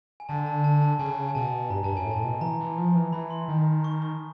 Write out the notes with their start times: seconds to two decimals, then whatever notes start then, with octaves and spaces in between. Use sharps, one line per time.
0.20 G#5
0.29 D3 A5
0.46 A5
0.64 A5
0.82 A5
0.99 C#3 G#5
1.29 G#5
1.35 B2 A5
1.70 G2 A#5
1.83 G2 A5
1.95 F#2 G#5
2.06 A2
2.11 A5
2.23 B2
2.41 E3 A#5
2.60 E3
2.78 F3
2.95 E3
3.12 E3 B5
3.31 C6
3.48 D#3
3.84 C#6
4.02 C#6